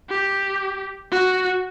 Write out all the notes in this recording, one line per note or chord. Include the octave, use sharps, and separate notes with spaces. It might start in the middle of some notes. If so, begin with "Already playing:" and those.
G4
F#4